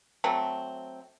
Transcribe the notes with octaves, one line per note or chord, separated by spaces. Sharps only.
F#3 A3 C4